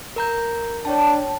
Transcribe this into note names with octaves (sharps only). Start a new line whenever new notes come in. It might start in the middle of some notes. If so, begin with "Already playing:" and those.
A#4 A#5 G6
D4 C#5 G5 A5